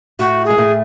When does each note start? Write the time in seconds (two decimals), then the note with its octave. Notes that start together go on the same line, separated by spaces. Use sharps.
0.19 A2 A3 F#4
0.45 G#4
0.50 G#3
0.58 A2 A3